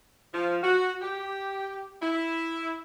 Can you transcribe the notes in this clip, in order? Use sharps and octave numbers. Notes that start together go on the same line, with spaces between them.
F3
F#4
G4
E4